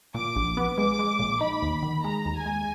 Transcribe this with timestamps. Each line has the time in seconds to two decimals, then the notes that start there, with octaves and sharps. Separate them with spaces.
0.14 A#2 D6
0.36 A#1
0.57 B3
0.78 G#3 D6
0.99 G#3
1.19 A#1
1.41 D#4 B5
1.62 D#2
1.83 D#3
2.04 G#3 A#5
2.25 D#2
2.36 G#5
2.46 G#3